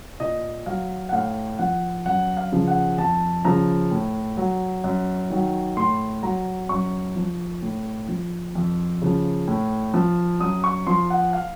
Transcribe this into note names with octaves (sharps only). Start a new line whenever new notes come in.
A#2 D#5
F#3 F5
F#5
A2 F5
F3 F#5
F#2 F#5
F5
C#3 F3
F#5
F2 A5
C#3 F3 A#5
A2
F#3
F#2
D#3 F#3
A2 C6
F#3 A#5
F#2 C#6
F3
A2
F3
F2
C#3 F3
A2
F3
F#2 D#6
C#6
F3 C6
F#5
F5